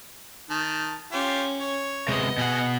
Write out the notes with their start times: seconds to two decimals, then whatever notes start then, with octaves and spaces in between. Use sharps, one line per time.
0.50 D#3 A5
1.12 C#4 F4 G4
1.60 C#5
2.08 C3 G#3 B3 D#5
2.38 B2 G#4 F#5 G#5